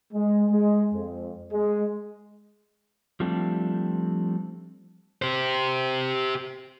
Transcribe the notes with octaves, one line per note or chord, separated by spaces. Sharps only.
G#3
G#3
F2
G#3
F3 G3 A3 C4 D4
G4 C5